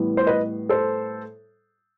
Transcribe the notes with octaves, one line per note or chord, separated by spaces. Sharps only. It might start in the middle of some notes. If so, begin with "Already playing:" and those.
Already playing: A2 E3 G3 B3
C5
B4 D#5
A4 C5